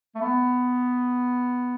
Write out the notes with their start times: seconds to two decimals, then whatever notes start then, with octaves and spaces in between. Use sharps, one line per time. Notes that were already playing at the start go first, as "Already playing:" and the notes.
0.15 A3
0.21 B3